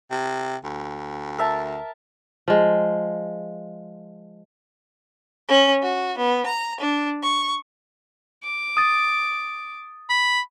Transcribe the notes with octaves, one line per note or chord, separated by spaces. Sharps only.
C3
D2
A#4 E5 A5
F3 G#3
C#4
F#4
B3
A#5
D4
C#6
D6
D#6 A6
B5